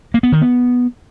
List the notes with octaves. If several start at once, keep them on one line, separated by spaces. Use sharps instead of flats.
A#3
B3
D#3
B3